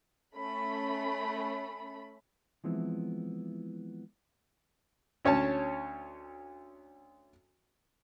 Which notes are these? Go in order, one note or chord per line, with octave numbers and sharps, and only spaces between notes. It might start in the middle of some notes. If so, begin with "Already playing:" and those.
A3 C#4 B5
E3 F3 G#3 B3 C4 E4
D2 C#4 C#5 A5